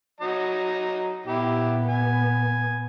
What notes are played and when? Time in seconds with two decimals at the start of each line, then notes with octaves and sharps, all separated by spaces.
0.21 F#3 D#5 A#5
1.26 A#2 B3 E4 G4
1.88 G#5